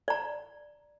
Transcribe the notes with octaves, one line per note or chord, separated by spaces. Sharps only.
D5 A#5